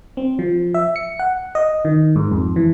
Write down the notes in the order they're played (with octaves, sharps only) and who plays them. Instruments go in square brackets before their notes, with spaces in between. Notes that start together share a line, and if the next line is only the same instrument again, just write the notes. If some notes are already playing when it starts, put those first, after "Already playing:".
[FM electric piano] C4
F3
E5
C#7
F#5
D#5
D#3
G#2
F2
E3